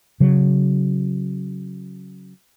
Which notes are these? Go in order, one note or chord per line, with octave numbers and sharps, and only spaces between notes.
C#3 F#3